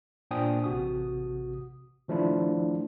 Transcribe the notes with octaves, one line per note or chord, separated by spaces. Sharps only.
A#2 D4 C5 G5 G#5 D#6
A1 C3 F#4 D#6
D#3 F3 A3 D4 E4 F4